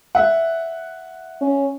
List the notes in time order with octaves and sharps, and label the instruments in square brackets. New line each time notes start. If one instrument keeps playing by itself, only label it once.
[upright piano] E5 F#5
[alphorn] C#4